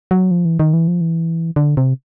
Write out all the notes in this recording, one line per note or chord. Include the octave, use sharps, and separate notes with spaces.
F#3
F3
E3
D#3
E3
F3
E3
D3
C3